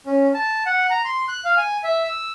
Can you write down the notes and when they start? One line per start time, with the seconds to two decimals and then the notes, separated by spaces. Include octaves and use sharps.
0.06 C#4
0.34 A5
0.66 F#5
0.90 A#5
1.05 C6
1.28 F#6
1.45 F5
1.57 G#5
1.84 E5
2.04 E6